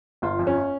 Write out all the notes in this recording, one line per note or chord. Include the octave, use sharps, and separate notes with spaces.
G1 F4
F2
C#4